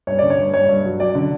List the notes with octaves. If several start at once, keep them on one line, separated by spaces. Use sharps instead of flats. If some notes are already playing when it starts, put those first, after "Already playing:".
G2 C#5
D3 D5
C#5
G2
G2 C#5
G2
F#3
F#3 D5
D3